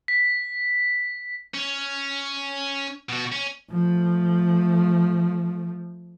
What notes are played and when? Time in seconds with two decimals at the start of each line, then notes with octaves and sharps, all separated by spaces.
0.08 B6
1.54 C#4
3.09 B2 F#4
3.32 C#4
3.72 F3 A3